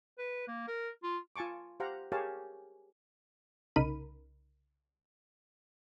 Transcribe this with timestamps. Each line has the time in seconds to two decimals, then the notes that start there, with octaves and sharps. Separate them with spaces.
0.18 B4
0.48 A#3
0.67 A#4
1.03 F4
1.36 F4 G#5 A5 C#6 D6
1.80 G4 C5 F5 F#5 A#5
2.12 G4 G#4 A#4 C#5 F5 A5
3.76 C2 C#3 D#4 A#4 B5 D#7